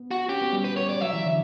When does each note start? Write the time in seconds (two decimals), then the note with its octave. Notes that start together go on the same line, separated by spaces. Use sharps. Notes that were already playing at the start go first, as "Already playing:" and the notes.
Already playing: B3
0.11 F#4
0.29 C#4 G4
0.41 B3
0.53 G3
0.65 B4
0.77 C#5
0.89 D5
1.01 F#3 E5
1.13 E3
1.25 D3